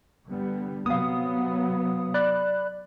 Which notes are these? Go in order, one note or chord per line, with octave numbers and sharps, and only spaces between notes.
D3 G3 B3
C3 F#3 B3 F5 D#6
D5 B5 F#6